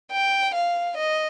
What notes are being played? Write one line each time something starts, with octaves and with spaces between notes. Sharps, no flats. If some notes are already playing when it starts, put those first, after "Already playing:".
G5
F5
D#5